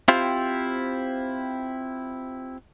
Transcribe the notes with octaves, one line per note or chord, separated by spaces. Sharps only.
C4 E4 F4 G4 C5